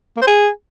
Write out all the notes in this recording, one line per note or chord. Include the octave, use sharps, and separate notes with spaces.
A#3
C5
G#4